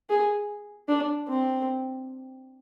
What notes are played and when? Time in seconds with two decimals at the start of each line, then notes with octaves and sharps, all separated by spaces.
0.10 G#4
0.89 D4
1.28 C4